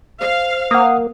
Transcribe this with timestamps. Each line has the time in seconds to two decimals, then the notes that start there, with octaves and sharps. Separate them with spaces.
0.21 C5 F5
0.71 A#3 F#5 D#6